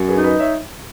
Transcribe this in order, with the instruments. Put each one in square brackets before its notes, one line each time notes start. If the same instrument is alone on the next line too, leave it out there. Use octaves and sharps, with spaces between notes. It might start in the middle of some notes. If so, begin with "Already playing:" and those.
Already playing: [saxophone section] F#2
[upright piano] G#4 B4
[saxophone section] D#4
[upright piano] B4 D#5
C#5 E5